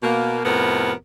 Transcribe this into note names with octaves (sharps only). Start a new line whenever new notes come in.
B2 A#3
F2 A2 C3 B3 A#4